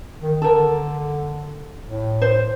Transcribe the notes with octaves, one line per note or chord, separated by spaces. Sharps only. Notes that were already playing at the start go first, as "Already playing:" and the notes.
D#3
D3 A4 A#4
A2
C5